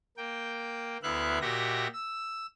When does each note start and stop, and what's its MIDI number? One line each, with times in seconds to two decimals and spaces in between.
0.17 0.98 58
0.17 0.98 79
1.03 1.39 38
1.03 1.39 59
1.03 1.39 64
1.03 1.39 76
1.03 1.39 77
1.03 1.39 90
1.41 1.87 46
1.41 1.87 66
1.41 1.87 67
1.41 1.87 75
1.41 1.87 76
1.41 1.87 94
1.94 2.47 88